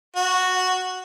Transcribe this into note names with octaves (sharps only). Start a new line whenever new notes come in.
F#4